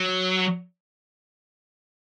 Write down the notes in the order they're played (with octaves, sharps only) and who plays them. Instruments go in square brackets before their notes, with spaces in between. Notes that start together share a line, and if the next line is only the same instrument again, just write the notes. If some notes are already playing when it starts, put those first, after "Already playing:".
Already playing: [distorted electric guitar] F#3